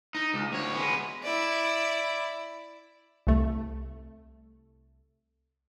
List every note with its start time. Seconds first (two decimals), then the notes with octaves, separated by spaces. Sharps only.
0.15 D#4
0.34 C#2
0.52 D2 C#5
0.75 G#3 B3
1.23 E4 D5
3.27 C2 A3